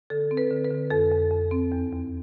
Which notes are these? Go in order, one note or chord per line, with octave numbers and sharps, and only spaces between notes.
D3 A4
C4
B4
D3
B4
D3
F2 A4
F2
F2
C4
E2
E2